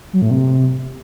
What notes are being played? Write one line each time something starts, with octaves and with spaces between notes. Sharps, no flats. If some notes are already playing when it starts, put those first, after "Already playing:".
F#3
A2
C3